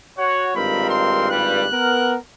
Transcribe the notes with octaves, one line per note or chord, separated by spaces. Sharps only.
F#4 C#5 F#5
G#1 G2 C4 D#4 F4 A#4 B5
C6
G3 B4 F#6
B3 A#4